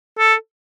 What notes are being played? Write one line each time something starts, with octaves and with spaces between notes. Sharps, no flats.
A4